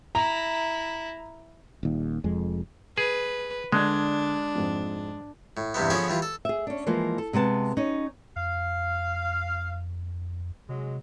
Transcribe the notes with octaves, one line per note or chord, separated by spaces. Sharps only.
E4 A#5
D#1 D#2
F1 F2 G#3
G#4 B4
D3 G#3 D4 F#6 G#6
F2 G#2
A2
E2 G2 C3 B3
D3 F3 B3 C#4 G#4 D5
E3 G3 F4
A4
G#4 E5
C#4 D4
E3 F3 G#3 A#3
A4
C3 G#3 B3 A5
C#4 D#4
F2 F5
C3 F#3 G#3